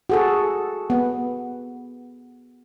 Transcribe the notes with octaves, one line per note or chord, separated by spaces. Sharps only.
F#4 G#4 A4
B3